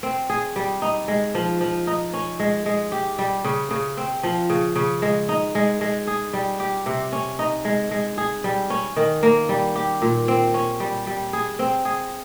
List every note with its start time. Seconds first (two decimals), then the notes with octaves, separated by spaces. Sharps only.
0.03 C4
0.30 G#4
0.56 G3
0.82 D#4
1.08 G#3
1.35 F3
1.61 F3
1.87 D#4
2.13 C#4
2.39 G#3
2.66 G#3
2.92 G4
3.18 G3
3.44 C#3
3.71 C#3
3.97 C4
4.23 F3
4.50 C#3
4.76 C#3
5.02 G#3
5.29 D#4
5.55 G#3
5.81 G#3
6.07 G#4
6.33 G3
6.60 G4
6.86 C3
7.12 C#4
7.39 D#4
7.65 G#3
7.91 G#3
8.18 G#4
8.44 G3
8.70 C#4
8.96 D#3
9.23 A#3
9.49 G3
9.76 G4
10.02 A#2
10.28 C4
10.54 C#4
10.80 G3
11.07 G3
11.33 G#4
11.59 C4
11.85 G#4